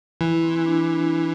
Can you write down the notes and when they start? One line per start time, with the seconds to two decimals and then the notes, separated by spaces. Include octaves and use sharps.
0.21 E3 E4
0.43 C4
0.66 D4